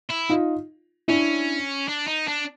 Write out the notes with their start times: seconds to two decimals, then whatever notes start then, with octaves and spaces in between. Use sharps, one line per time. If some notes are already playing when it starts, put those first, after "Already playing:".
0.09 E4
0.30 D#4 F4
1.08 C#4 D4 E4
1.88 D4
2.07 D#4
2.27 D4